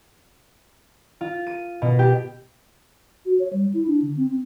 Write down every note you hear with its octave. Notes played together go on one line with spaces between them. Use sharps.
F4
D#7
B2
G4
F#4
C#5
G3
E4
D4
D3
C4
C4